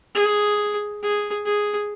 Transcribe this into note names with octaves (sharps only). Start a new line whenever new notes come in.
G#4
G#4
G#4